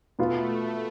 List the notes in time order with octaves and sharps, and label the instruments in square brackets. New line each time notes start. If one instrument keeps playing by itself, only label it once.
[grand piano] B2 B3 F4 [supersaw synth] A3